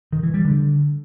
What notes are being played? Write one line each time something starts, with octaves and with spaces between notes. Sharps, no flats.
D#3
E3
G3
D3